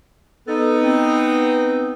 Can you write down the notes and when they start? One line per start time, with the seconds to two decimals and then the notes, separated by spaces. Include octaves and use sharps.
0.47 B3 D#4 A4
0.82 C4